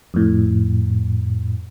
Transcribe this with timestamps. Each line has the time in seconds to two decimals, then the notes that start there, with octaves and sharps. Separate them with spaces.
0.14 F2 A2